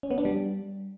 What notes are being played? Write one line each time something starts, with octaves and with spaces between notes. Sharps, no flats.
C#4
B3
D4
G3